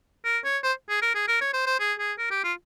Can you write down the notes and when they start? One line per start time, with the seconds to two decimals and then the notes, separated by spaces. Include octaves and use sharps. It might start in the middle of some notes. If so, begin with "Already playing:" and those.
0.25 A#4
0.44 C#5
0.63 C5
0.89 G#4
1.02 A#4
1.15 G#4
1.28 A#4
1.41 C#5
1.53 C5
1.66 C5
1.80 G#4
1.99 G#4
2.18 A#4
2.31 G4
2.44 F4